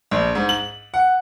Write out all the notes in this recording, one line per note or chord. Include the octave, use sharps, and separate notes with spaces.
A#1
G#2
F#7
F#5